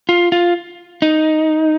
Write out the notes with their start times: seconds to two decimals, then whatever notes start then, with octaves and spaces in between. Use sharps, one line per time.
0.09 F4
0.32 F4
1.02 D#4